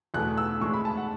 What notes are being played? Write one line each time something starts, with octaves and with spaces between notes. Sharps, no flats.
E2 B2 A3 F#6
E6
A2 E3 G#3 C#6
B5
A5
F#5